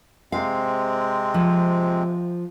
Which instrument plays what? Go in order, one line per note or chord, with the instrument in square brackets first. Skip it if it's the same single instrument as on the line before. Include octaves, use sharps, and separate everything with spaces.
[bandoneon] C3 G#3 C4 [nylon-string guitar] F5
[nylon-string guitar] F3